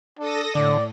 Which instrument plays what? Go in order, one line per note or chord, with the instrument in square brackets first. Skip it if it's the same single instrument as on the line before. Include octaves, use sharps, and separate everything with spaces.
[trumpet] D4 [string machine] A4 D#6 A#6
[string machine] A2 [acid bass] D3 [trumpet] D5